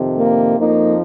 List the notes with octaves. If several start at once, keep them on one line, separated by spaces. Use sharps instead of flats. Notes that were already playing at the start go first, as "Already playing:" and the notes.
Already playing: F2 C3 D#3
A#3
F2 F3 A#3 D#4